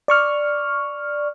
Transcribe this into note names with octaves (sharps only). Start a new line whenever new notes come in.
D5 C#6 F6